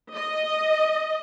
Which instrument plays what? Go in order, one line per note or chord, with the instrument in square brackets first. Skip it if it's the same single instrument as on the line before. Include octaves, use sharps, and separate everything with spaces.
[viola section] D#5